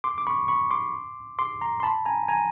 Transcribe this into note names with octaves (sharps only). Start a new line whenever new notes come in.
C6 D6
D6
B5 C#6
B5 C#6
C6 D6
C6 D6
A#5 C6
C6
A5 B5
G#5 A#5
G#5 A#5